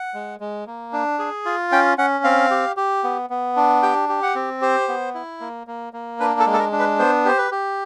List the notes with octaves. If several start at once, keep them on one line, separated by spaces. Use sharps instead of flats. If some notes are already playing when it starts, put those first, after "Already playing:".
Already playing: F#5
G#3
G#3
A#3
D4
G#4
F4
C#4 G5
C#4 F#5
C4 F5
G4
G4
B3
B3
D4
G4 G5
G4
F#5
C4
G4 C5
B3
E4
A#3
A#3
A#3
D4 B4
A4
G#3
A4
A#4
D4
B4
B3 C5
G4 C5
B4
G4